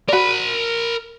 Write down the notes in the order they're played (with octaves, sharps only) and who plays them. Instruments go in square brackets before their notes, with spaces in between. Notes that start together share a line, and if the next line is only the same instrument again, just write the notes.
[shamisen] F#4 D5 [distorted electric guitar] A#4 B5